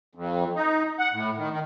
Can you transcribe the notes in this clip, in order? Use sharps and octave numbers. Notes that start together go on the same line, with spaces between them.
F2
D#4
F#5
A2
D#3
D#3